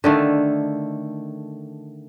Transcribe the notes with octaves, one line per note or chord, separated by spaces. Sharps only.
D3 D#3 A3